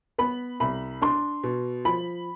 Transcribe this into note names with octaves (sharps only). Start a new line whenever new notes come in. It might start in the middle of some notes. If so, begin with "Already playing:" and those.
B3 B5
C2 B5
D4 C6
B2
F3 B5